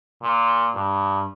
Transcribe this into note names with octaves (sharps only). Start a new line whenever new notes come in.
A#2
G2